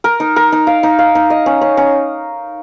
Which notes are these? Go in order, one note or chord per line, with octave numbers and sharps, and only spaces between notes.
A#4
D#4
A#4
D#4
F5
D#4
F5
D#4
D#5
C#4
C#4
C#4